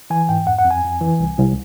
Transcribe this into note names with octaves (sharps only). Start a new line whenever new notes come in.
E3 G#5
G#2 G5
F2 F#5
F#5
F2
G#5
F2
E3
C2
C2